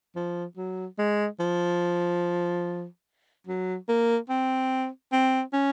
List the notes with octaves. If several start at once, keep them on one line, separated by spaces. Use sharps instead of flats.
F3
F#3
G#3
F3
F#3
A#3
C4
C4
C#4